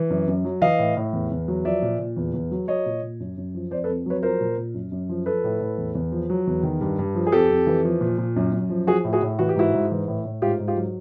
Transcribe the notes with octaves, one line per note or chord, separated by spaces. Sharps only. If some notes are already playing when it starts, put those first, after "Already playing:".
Already playing: E3
F#2
F#2
F#3
E3 D#5 F5
A2
A2
E2
E2
F#3
F3 D5 E5
A#2
A#2
E2
E2
F#3
F#3 C#5 D#5
A#2
A#2
F#2
F#2
F3
F2 C5 D5
A4 B4
F2
F#3 B4 C#5
F3 A#4 C5
A#2
A#2
F#2
F#2
F3
F3 A4 B4
A2
A2
E2
E2
F3
F#3
E2
D#3
G2
G2
F3
G#4
F2 G4 A4
F2
E3
F3
A#2
A#2
F#2
F#2
F3
F3 F#4 G#4
A2
F#4 G#4
A2
E3 F#4
G4
G#2 E4 F#4
G#2
E3
A2
A2
G#2 F4 G4
G#2
F4 G4
F#3